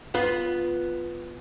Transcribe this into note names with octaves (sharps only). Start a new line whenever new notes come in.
B3 F4 B4